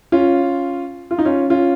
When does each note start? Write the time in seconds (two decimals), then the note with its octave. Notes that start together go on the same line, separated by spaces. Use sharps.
0.12 C#4 F4
1.11 F4
1.19 D#4
1.25 C#4 F4
1.50 C#4 F4